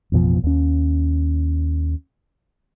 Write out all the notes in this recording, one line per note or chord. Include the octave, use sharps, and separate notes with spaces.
A1 F2 B2 F3
D#2 C#4